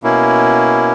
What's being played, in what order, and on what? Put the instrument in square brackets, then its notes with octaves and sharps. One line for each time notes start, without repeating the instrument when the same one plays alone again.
[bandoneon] B2 A#3 C#4 E4